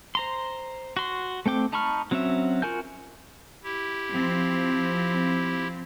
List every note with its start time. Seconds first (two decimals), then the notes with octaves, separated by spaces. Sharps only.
0.15 C5 A#5 C6
0.97 F#4 C6
1.46 A3 C4 G5 D6
1.72 D#4 A5 B5 C#6 F6
2.11 F#3 C4 C#4 F#4 E5
2.62 F4 F#4 A#4 G#5 G6
3.63 E4 G4
4.13 F3 C4